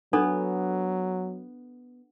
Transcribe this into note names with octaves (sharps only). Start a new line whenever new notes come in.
F#3 B3 D4 A4